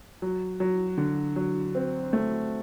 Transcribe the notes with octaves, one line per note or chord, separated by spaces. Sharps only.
F#3
F#3
D3
F#3
C4
A3